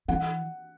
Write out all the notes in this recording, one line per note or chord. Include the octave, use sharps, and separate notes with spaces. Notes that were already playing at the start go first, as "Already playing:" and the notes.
E3 F#5